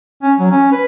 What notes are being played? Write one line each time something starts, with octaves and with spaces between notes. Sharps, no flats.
C#4
F#3
C#4
B4